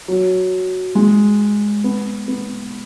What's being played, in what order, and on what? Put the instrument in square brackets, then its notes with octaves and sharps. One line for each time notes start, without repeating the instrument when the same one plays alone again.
[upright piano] F#3
G#3
B3
B3